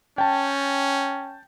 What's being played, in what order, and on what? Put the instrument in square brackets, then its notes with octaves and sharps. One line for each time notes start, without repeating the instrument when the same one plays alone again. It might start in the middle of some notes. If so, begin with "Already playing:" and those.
[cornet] C#4 [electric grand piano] G5 A5